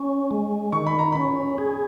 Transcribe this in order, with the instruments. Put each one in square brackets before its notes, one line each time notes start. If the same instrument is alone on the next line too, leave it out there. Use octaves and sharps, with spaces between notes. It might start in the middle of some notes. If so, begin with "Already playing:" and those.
Already playing: [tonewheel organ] C#4
G#3
[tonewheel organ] D#3 [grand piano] C#6
[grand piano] B5
A#5
[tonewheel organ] C#4 [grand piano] B5
[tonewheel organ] G#4